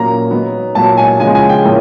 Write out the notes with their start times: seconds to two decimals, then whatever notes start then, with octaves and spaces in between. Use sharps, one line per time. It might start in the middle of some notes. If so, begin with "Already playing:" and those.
Already playing: A#2 F#3 A#3 C#4 A#5
0.30 D#3 F#3 B3
0.75 A#2 F#3 B3 A5
0.97 G#5
1.20 C#3 F3 G#3 C#4 G#5
1.35 G#5
1.49 G5
1.64 A2 F3 A#3 C#4